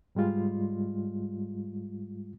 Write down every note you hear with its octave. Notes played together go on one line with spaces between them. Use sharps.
G#2 G3 G#3 F4